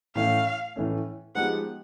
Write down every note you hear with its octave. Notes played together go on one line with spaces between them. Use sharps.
A2 E3 A3 C#4 F5
A2 E3 A3 C#4
F3 G#3 B3 D#4 G4 F#5